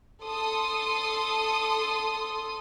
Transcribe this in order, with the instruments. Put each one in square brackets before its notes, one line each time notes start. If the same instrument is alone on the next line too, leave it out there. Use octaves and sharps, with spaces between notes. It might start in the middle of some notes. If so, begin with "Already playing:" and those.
[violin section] A4 C6 D#6